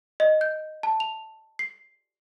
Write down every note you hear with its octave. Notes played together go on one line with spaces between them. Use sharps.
D#5
G6
A5
F7
C7